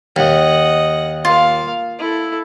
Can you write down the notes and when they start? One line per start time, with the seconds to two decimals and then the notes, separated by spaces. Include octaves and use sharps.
0.16 D#2 D#5 F#5
1.25 A#3 F4 F5
1.99 E4 A4